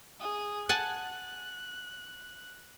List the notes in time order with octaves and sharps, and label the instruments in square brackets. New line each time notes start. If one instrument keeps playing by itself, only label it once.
[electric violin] G#4 D#6
[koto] F#5 G#5 A5 [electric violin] F#6